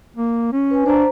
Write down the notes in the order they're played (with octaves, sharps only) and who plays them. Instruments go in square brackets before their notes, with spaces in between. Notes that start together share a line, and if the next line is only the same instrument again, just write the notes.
[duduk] A#3
C#4
[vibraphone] B4 G#5
[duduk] D4 [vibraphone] C5 A#5